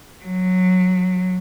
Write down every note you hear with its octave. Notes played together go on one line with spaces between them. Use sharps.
F#3